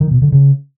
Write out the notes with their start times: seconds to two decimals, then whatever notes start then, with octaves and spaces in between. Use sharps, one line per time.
0.01 D#3
0.11 B2
0.22 D3
0.32 C#3